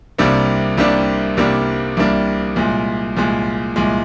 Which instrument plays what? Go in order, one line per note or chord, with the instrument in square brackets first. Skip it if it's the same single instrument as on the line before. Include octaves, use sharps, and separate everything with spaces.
[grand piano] C2 C3 G3 A#3 D4
C2 C3 G3 A#3 D4
C2 C3 G3 A#3 D4
C2 C3 G3 A#3 D4
C2 A#2 G#3
C2 A#2 G#3
C2 A#2 G#3